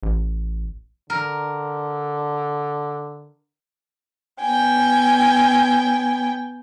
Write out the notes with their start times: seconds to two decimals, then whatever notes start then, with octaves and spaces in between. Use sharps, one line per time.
0.03 A1
1.10 D3 A#4
4.41 B3 G5 G#5